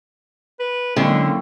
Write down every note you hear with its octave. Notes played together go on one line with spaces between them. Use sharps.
B4
D3 F#3 G#3 A#3 C4 C#4 E4